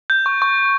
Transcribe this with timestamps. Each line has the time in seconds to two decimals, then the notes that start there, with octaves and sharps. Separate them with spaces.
0.10 G6
0.26 C#6
0.42 C#6